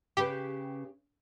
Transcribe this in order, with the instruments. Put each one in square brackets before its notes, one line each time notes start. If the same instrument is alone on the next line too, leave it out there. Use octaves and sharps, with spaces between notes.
[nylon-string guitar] C#3 C#4 B4 [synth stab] G4